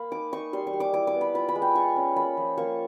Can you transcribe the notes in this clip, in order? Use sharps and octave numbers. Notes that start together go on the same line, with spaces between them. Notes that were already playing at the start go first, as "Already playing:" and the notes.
Already playing: A#3 B5
D#4 D6
D#4 C#6
G3 C6
C#6
G3
D6
E4 D6
D6
B3
B5
F4 B5
B5
G#3
G5
F4 C#6
C#4
A#3 B5
F3
A#3 C#6